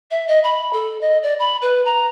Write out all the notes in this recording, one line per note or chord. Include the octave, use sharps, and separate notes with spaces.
E5
D#5
B5
A4
D#5
D5
B5
B4
A#5